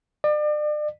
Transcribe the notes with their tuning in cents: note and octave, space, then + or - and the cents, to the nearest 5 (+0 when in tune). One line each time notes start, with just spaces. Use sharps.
D5 +35